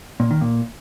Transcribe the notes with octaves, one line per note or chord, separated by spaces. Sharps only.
A#2
D#3
A#2